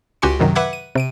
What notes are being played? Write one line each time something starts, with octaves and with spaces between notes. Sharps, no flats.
C#2 F#4 G4 G#5 C6 C#7
F#2 C3 D#3 F#3
B4 E5 F#5 D6 F#6 G#6
D#7
C3 D7 D#7